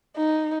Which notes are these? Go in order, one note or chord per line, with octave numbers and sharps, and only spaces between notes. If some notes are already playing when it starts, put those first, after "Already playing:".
D#4